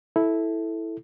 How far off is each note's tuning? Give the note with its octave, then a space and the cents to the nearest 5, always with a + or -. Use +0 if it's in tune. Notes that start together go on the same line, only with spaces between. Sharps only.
E4 -5 A4 +0